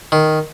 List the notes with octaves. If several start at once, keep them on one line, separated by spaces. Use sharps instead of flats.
D#3